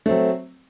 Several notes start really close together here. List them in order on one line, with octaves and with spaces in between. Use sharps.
A3 C4 F#3